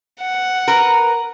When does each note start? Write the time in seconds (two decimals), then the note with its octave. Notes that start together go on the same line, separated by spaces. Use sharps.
0.20 F#5
0.68 A#4 B4